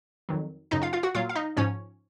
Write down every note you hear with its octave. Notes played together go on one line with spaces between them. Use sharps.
F2 D#3 F#3
F#2 C#3 F#3 D#4 D#5
F4 F5
F4 F5
F#4 F#5
A#2 F#3 F4 F5
F5
D#4 D#5
G#2 F3 C#4 C#5